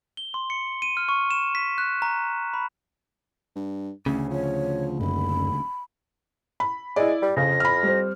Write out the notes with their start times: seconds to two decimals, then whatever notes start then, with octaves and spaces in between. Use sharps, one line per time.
0.17 G7
0.34 C6
0.50 C#7
0.82 D#7
0.97 F6
1.09 C#6
1.31 E7
1.55 B6
1.78 F#6
2.02 A#5
2.54 B5
3.56 G2
4.06 A1 D2 C#3 C#4
4.31 F3 C#5
5.00 D#1 F#2 B5
6.60 B5
6.96 G#3 E4 D5
7.22 G3
7.37 F2 C#3 A#6
7.60 B5 F6
7.83 G3 C4